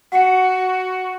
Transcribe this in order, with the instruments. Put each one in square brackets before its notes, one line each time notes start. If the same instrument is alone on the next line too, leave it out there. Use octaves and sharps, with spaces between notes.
[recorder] F#4 [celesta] F#5 C#7